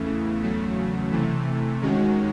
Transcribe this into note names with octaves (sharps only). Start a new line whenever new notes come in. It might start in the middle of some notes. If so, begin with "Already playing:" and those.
Already playing: E2 C#3 E3 A3
E2 C#3 F#3 A3
C3 E3 A3
D#2 D#3 G#3 C#4 F#4